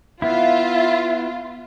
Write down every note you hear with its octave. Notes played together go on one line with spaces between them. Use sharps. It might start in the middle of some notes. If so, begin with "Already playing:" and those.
B3 E4 F4 E5